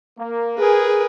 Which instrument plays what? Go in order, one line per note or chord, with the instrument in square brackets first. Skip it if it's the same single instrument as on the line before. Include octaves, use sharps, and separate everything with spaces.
[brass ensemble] A#3
[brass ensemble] G#4 [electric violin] A#4 B4